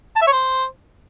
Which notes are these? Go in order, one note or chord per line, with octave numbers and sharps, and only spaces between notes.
A5
E5
C#5
C5